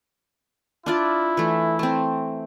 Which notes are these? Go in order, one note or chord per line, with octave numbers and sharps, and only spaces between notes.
D4 E4 F4 D5
E3 A3
A3 C4